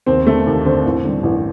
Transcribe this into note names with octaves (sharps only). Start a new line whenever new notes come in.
D#2 C4
D3 A3
D#2
D3 C4
A1
G2 D3
A1